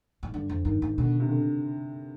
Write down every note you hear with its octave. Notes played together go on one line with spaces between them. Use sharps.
G#2
G2 D3
F2
G2 D#3
G#2
B2 D3
C3
D3